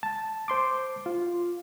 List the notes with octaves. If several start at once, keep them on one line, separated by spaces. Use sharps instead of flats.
A5
C5 C6 D6
F4